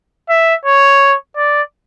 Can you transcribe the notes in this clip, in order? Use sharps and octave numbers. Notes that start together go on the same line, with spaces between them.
E5
C#5
D5